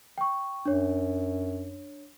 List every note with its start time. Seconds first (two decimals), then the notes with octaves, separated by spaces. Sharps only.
0.18 G5 C#6
0.66 F#2 D4 C#5